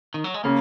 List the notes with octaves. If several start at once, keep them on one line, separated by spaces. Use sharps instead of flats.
D#3
F#3
G#3
C#3 A#3